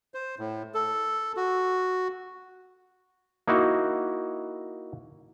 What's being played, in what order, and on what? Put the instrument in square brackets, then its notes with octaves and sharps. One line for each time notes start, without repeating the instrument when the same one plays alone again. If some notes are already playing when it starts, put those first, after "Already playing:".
[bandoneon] C5
A2
A4
F#4
[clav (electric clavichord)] A#3 D#4 E4 F#4